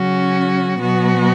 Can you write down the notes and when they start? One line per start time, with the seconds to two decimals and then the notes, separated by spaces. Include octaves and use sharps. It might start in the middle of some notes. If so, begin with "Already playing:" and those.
Already playing: C#3 F#3 C#4 F#4
0.80 B2 F#3 B3 F#4